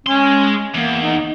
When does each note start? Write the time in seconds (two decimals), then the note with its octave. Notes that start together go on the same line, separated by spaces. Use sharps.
0.07 G#3 C#4 C6
0.75 E2 A#3
1.02 D#4